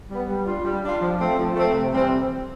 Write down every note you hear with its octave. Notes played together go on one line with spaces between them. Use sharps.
G3 B3
G3
D4 F4
G3
D4 F4
F3
A3 C4
F3
A3 C4
C3
E3 G3 C4